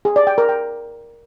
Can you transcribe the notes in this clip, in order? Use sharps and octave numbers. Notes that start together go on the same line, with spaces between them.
G#4
D5
G5
A#4
G5